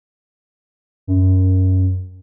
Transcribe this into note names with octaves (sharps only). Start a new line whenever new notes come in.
F#2